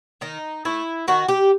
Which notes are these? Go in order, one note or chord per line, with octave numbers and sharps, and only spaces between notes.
D#3 D#4
A3 E4
D#3 F#4
G4